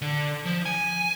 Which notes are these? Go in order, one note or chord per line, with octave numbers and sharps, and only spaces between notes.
D3
F3
G#5